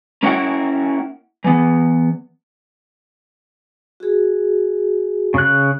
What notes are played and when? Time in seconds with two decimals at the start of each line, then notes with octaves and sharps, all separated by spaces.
0.23 A#3 C#4 D4 E4 F#5 G5
1.44 E3 B3
4.00 F#4 G#4
5.34 C#3 F#6